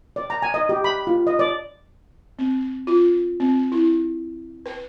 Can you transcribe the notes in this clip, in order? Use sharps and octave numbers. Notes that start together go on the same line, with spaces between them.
D5
A#5
G#5
D#5
G4
B5
F4
D#5
D5
C4
F4
C4
E4
B4